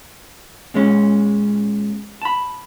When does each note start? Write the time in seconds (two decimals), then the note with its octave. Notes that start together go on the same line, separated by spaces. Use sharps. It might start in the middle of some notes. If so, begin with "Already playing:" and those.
0.74 A#2 G#3 C#4
2.22 A5 B5